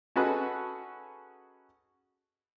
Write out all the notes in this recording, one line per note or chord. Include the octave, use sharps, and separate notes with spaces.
C#4 D#4 F#4 G#4 A4 B4